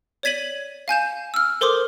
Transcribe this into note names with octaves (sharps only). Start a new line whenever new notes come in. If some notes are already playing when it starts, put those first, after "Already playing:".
C#5 D5 G#6 B6 D#7 F#7
F5 G#5 G6 E7
E6 F6
A4 A#4 C5 C6 D6 D#6